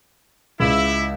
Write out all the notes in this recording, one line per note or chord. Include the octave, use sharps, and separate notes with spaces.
C#2 E4